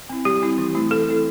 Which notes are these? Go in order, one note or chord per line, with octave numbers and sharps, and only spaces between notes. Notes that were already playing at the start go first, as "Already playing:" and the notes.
C4 E4
G3 G4
C4 E4
E3
A3 C4 E4
E3 A4
A3 C4 E4